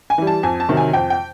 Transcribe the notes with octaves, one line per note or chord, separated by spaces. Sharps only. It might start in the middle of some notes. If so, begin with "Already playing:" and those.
G#5
E3 G3
A5
F2 G#5
A5
C3 D#3 F#3
G#5
F2 G5
G5